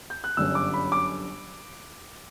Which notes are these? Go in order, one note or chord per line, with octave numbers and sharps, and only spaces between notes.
G6
F#6
G1 F#2 D3 G3 C#4 E6
D6
B5
D6